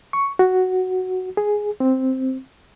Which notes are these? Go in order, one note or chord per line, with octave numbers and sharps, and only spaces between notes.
C#6
F#4
G#4
C4